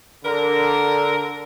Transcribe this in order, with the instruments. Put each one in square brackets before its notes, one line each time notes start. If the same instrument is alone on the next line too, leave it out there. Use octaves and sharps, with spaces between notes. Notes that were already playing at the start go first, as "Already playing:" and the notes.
[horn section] D3 A#4